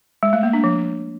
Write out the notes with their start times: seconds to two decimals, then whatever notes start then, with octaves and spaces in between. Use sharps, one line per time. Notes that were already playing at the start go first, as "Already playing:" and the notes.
0.23 G#3
0.33 A3
0.43 A#3
0.53 D4
0.64 F3